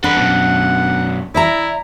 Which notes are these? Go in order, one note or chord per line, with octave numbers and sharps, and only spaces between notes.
D4 A4 B4 F#5
F#2 B2
E4 D5 E5 A#5